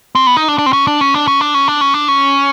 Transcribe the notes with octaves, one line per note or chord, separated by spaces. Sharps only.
C4
B3
D#4
D4
D4
C4
C#4
D4
C#4
D4
C#4
D4
C#4
D4
C#4
D4
C#4